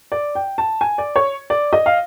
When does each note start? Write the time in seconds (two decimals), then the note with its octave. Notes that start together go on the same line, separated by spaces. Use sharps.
0.12 D5
0.35 G5
0.58 A5
0.81 G#5
0.98 D5
1.16 C#5
1.50 D5
1.73 D#5
1.86 F5